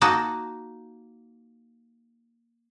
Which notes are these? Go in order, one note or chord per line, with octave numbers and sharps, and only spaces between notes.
A#3 D#4 F#4 A5